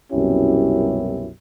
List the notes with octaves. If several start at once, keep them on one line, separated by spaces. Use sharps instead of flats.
C2 F#2 B2 C#4 E4 G4